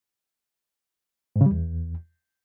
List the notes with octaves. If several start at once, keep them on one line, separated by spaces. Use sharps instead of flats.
G#2
C#3
G3
E2